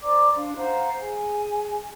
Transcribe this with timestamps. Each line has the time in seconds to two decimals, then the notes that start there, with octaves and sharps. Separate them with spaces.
0.01 C5 D5 A#5 D6
0.35 D4 F5 C6
0.56 C5 F5 F#5 A#5
0.99 G#4 G#5